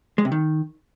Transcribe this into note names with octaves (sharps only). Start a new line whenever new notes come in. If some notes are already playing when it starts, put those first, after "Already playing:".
G#3
C3
D#3